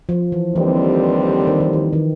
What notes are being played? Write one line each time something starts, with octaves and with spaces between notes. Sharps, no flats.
F3
E3
D#2 D3 E3 G3 C4
D#3
E3
D#3
D#3